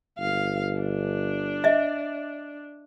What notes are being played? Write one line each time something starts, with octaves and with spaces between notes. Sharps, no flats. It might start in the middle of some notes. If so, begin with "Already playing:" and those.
G1 F5
D4
D#5 E5